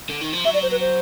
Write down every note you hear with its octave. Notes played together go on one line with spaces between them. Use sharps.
D3
D#3
F3
F#3 E5
D5
C5
B4
C5